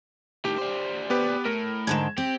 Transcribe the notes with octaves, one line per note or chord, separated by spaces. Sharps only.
A2 D#3 G4
D4 C5
B3 G4 B4
A2 A#4
G#2 D3 D#3 G#6 E7
C4 G4